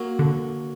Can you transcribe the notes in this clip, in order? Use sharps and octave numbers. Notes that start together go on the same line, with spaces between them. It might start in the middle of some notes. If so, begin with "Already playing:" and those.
Already playing: F#3 A#3
D3